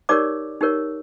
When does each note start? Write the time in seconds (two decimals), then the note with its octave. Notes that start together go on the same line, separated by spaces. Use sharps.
0.09 D#4 G4 A#4 C#5 D5 D6
0.61 D#4 G4 A#4 C#5